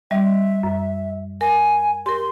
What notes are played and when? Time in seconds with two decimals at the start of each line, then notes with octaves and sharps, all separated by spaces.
0.11 G3 D#5 E5
0.63 F#2
1.41 A#4 G#5
2.06 G4 A#4 C6